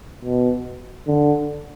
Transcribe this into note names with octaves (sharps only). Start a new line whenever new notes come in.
B2
D3